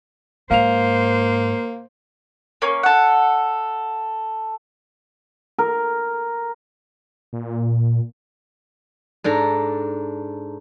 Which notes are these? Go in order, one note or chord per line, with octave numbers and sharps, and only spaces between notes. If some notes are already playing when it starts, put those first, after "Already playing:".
G#2 A#3 C5 F5 F7
A#3 C#4
A4 F#5
A#4
A#2
G#2 D4 A4 A#5